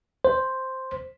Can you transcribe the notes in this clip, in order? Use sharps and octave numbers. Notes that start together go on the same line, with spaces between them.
C5